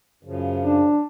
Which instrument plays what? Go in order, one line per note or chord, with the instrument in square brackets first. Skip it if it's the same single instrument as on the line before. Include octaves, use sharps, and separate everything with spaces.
[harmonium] F#2 C#3 F3
[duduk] D4